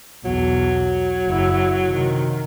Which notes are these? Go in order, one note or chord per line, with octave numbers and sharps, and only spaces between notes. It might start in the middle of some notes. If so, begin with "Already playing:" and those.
B1 E2 F#3
F#1 E4
C3 D#3